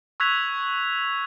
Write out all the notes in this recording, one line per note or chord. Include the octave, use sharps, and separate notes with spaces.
C#6 E6 F#6 G#6 B6 F7